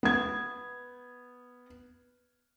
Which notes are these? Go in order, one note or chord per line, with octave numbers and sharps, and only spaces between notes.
B3 G#6